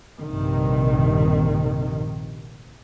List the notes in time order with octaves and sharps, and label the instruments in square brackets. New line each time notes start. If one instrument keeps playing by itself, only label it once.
[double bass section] A#1 G2 C3 D#3